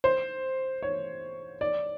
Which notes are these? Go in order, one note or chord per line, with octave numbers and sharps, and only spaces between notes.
C5
C#5
D5